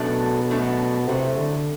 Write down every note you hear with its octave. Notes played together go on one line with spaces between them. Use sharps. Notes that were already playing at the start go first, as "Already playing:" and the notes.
Already playing: F#2 B2 F#3 A3 D4 A4
F#2 F#3 A3 D4 A4
A2 C3 F#3 A3
D3